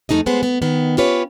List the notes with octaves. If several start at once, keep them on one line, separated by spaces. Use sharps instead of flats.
F2 A3 D#4 G#4 D#5
G#3 B3 C5
B3
D#3 B3
C#4 F4 G4 B4 C#5